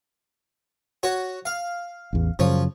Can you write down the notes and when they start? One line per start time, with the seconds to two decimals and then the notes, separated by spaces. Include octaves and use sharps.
1.03 F#4 C#5
1.45 F5
2.13 A1 E2
2.39 F#2 C#3 F3 C#5